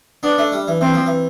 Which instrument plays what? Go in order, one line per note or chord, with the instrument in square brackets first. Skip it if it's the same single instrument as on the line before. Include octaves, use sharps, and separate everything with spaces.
[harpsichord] B3 [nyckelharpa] D4
[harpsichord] A3
G3
E3
[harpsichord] E3 [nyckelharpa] C4
[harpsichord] F3
E3